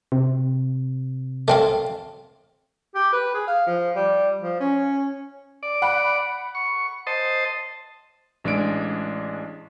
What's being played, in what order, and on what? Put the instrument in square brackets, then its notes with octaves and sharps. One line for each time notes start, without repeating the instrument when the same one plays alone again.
[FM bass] C3
[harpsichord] A3 C4 F5
[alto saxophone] G4
B4
G#4
F5
F3
G3
F3
C#4
[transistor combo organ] D5
[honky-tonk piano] F#5 B5 F#6
[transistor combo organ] C#6
C5 D#5 A5
[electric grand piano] A1 G#3 D4 G#4 D7